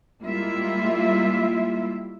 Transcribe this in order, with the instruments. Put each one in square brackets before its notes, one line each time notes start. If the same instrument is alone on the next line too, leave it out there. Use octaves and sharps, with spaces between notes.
[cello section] G3 G#3 A#3 E4 F4 E5